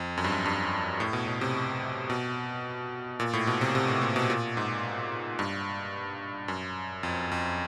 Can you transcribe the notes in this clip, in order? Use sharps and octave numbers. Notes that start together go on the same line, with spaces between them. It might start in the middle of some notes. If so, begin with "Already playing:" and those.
Already playing: F2
F#2
G2
F#2
G2
A2
B2
B2
C3
B2
A#2
A2
B2
C3
C3
A2
A#2
B2
A#2
G#2
G2
F#2
F2
F2